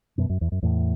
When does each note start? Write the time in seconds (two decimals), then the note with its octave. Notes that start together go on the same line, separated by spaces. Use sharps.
0.18 F#2 B2
0.29 F#2
0.41 E2
0.52 F#2
0.63 E2 A2